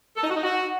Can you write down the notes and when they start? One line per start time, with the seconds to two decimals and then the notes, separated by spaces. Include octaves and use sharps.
0.17 A4
0.23 D#4
0.30 F#4
0.37 D#4
0.43 F#4